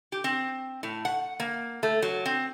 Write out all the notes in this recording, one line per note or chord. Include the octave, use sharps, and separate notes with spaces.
G4
C4
A2
F#5
A#3
A3
F#3
C4